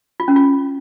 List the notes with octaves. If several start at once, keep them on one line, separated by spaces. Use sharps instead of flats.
F4
C#4
F4